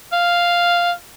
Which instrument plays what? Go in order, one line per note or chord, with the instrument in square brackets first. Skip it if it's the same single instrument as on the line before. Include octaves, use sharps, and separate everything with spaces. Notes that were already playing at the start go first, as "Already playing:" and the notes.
[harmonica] F5